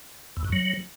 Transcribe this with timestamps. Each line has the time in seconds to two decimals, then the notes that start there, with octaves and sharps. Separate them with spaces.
0.37 E2
0.45 F#2
0.52 F#3